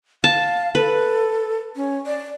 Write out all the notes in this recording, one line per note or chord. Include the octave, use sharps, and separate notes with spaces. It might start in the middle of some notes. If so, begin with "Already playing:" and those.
F5 A5
A4 B4
C#4
D5